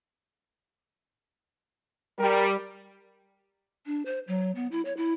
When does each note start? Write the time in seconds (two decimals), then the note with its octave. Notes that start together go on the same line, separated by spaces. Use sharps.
2.19 G3 A#4
3.86 D4
4.06 C5
4.28 F#3
4.55 B3
4.72 E4
4.85 C#5
4.97 E4